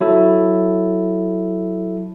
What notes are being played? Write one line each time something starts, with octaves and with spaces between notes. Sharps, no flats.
F#3 E4 A4